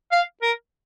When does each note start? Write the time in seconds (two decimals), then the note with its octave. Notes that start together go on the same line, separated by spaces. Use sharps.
0.12 F5
0.42 A#4